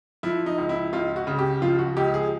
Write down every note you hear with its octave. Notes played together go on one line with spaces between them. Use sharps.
F3 E4
D#4
C#2
E4
C#2 F4
F#4
C#3
G4
F3 F4
F#4
C#2 G4
G#4